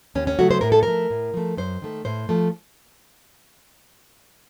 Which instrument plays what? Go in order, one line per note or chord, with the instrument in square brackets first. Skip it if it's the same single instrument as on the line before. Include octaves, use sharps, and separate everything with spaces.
[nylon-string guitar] D#2 C#4
C#4
C#3 F#3 A3 F#4
C5
A2 A#4
A4
F3 A3 A#4
A2
F3 A3
F#2 C5
D#3 A3
A2 C5
F3 A3